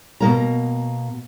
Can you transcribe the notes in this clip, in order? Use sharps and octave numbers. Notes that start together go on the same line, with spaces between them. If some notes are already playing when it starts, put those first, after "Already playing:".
B2 A#3 A#5